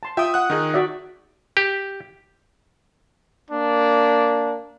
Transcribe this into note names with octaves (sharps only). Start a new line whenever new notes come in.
A5 C6
F4 E5 G5 D#6
F#5 F#6
D#3 D#4 G#4
F#4 D5 E5
G4
A#3 D4